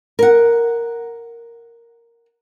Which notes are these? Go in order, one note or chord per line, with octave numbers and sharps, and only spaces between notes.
A#4 F#5